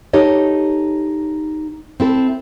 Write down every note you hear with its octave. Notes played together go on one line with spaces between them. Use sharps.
D#4 G4 A4 C#5 D#5
C4 E4 A4